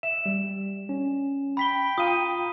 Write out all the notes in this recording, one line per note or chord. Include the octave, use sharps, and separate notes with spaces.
E5 E7
G3
C#4
G5 B5 B6 G7
F4 F5 A#5 D#6 D#7